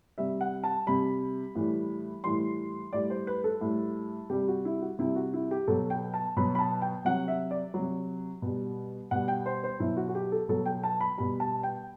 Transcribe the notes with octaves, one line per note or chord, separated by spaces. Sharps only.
C3 G3 E5
F#5
A5
C3 G3 B5
A2 E3 G3
A2 E3 G3 C6
A2 G3 D5
C5
B4
A4
A2 G3
C3 G3 G4
F#4
E4
F#4
C3 G3 E4
F#4
E4
G4
B2 F#3 A4
G5
A5
B2 F#3 B5
B5
A5
G5
C3 F#3 F#5
E5
D5
C3 F#3
B2 G3
B2 G3 F#5
G5
C5
C5
B2 F#3 E4
F#4
F#4
G4
A4
B2 F#3 A4
G5
A5
B5
B2 G3 B5
A5
G5